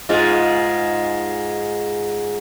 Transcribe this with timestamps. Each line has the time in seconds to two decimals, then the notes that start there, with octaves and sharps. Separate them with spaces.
0.09 G#2 G#3 F4